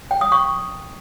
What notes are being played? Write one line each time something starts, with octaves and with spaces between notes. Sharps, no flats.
G5
D#6
C#6